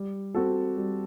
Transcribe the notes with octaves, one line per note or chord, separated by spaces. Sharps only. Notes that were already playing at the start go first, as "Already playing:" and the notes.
Already playing: G3
C4 F#4 A4
G3